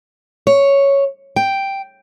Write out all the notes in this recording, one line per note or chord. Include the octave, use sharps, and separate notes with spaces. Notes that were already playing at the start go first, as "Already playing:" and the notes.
C#5
G5